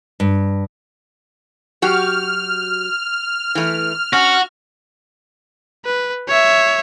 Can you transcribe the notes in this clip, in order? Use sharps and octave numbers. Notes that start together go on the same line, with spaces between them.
G2
F#3 F#4 G4 F6
E3 A3
C#4 F#4
B4
C#5 E5